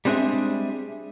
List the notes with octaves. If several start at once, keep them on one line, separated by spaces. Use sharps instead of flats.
G3 G#3 C4 D4 G#4 E5